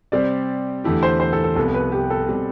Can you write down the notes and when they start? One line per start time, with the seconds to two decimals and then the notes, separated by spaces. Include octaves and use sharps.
0.12 C3 G3 C4 G4 C5 D5
0.84 E2 D3 A3 E4 G4
1.03 C5
1.20 C5
1.33 A4
1.44 A4
1.56 C2 C3 F3 B3 A4
1.74 B4
1.92 G4
2.10 A4
2.29 B2 G3 C4